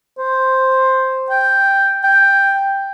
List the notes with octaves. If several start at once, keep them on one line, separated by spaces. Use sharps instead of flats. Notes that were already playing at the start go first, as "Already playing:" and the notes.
C5
G5
G5